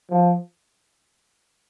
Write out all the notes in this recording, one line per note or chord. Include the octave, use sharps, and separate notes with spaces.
F3